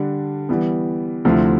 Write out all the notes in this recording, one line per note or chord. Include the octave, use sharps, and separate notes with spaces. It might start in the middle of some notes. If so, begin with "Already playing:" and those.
Already playing: D3 G3 D4
E3 G3 B3
D2 C3 F3 A3 E4